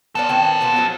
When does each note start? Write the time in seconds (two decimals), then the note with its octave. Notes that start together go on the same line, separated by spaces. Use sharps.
0.15 B3 C#4 F4 A4 D5
0.29 D#3 E3 C4
0.61 B2 B3 F4
0.76 F3 F#3 D#4